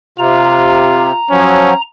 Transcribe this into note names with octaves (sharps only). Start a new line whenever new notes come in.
C3 F4 A#5
F3 F#3 C#4